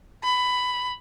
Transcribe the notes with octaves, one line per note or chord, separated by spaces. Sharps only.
B5